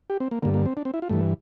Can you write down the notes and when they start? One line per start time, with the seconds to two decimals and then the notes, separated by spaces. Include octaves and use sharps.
0.10 G4
0.20 C4
0.31 A#3
0.42 G2 D3 A#3
0.54 A#3
0.66 C4
0.77 D4
0.85 C4
0.94 E4
1.02 F4
1.09 G2 E3 A3